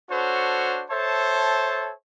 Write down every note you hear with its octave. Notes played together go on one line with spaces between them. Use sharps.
D4 F#4 A4 C5 C#5
A4 C5 C#5 E5 A5